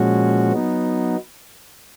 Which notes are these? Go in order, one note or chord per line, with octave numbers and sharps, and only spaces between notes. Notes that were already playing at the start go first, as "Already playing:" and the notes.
Already playing: A#2 F3 G#3 C#4 F#4
F#3 B3 D#4